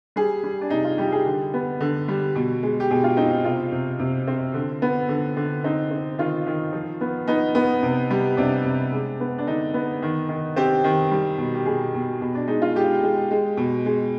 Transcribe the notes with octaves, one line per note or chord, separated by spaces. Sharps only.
G3 G#4
G3
D4
C3 D#4
F4
G3 G4
G#4
D3
B3
D3
G3
B2
G#3
G4
B2 G#4
F4
C4 D#4
D#4
C3 F4
C3
C3
C4
D3
B3
D3
D3
C4 D#4
C4
D#3 F4
D#3
F3
B3
B3 D#4
B3
C3
G3
C3 D4
C3
G#3
B3
D4
D3 D#4
B3
D#3
D#3
C4 G4
D#3
G3
B2
G4
B2 G#4
B2
B2
D4
G#3 D#4
F4
G#3 G4
G#3
G#3
B2
G#3